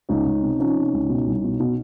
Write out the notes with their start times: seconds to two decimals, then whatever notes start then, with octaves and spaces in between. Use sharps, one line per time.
0.09 C#2 C#4 D#4
0.26 C#2
0.42 C3
0.60 F3 C#4 D#4
0.76 C3
0.93 C#2
1.10 B2
1.27 C2
1.44 B2
1.60 B2